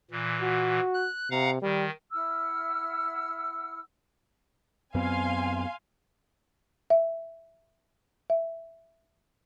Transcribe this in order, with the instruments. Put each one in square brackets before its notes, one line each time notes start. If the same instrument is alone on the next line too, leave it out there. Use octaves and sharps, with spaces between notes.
[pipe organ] A#2 E3
[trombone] F#4
[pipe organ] F#6
[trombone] C3 [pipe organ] F5 F#5 A#5
[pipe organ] D#3 [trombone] G3
[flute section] E4 F#5 E6 F6
[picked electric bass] F#2 B3 C4 [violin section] F5 G#5 C6
[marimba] E5
E5